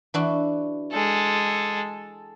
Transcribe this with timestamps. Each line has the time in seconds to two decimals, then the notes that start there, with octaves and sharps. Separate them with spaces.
0.14 E3 D4 F#4
0.92 G#3 A4